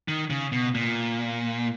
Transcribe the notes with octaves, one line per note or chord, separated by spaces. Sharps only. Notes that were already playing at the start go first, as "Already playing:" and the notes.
D#3
C#3
B2
A#2